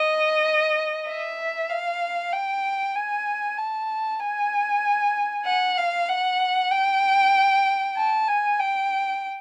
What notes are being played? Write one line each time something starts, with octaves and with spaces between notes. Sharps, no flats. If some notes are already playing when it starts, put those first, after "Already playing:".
Already playing: D#5
E5
F5
G5
G#5
A5
G#5
F#5
F5
F#5
G5
A5
G#5
G5